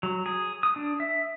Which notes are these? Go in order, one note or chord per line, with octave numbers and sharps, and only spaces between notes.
F#3
G#4
D#6
D4
E5